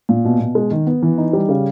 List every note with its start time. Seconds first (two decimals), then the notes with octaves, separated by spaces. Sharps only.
0.09 A#2
0.25 B2
0.40 B2
0.55 G#3
0.71 D#3
0.87 B3
1.03 E3
1.18 D#4
1.33 G3
1.49 C#3